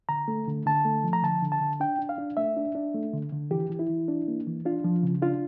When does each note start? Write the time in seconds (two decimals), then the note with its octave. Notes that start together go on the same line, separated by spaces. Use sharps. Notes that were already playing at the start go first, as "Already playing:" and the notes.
0.09 D3 A#5
0.28 A3
0.48 D3
0.66 D3 A5
0.85 A3
1.04 F3
1.13 A#5
1.23 D3 A5
1.42 D3
1.52 A5
1.61 D3
1.80 D4 G5
1.99 D4
2.09 F5
2.18 D4
2.37 A3 E5
2.56 D4
2.75 D4
2.95 A3
3.13 D3
3.32 D3
3.51 E3 G4
3.70 E3
3.79 E4
3.89 E3
4.08 D4
4.28 A#3
4.47 E3
4.65 D4 F4
4.84 F3
5.03 C#3
5.22 D4 F4